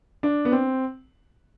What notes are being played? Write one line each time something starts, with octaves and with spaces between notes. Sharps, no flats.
D4
B3
C4